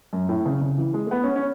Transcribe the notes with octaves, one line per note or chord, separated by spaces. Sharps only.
F#2
A2
C#3
C#3
E3
G#3
A3
B3
C#4
C#4